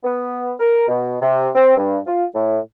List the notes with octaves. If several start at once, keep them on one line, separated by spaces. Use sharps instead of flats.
B3
A#4
B2
C3
C4
G2
F4
A2